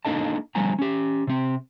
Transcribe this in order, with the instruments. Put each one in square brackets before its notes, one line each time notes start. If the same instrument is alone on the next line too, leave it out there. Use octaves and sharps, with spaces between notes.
[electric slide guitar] A#3 D4 D#4 A4 D#5 A5
D3 F3 G3 B3 G#5 A#5
C#4 G4
C3 C4